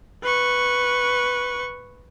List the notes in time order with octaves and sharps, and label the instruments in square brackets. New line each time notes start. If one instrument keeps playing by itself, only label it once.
[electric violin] B4 C#6